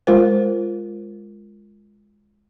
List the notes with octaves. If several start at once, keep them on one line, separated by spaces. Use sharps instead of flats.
G#3 F4 A#4 C5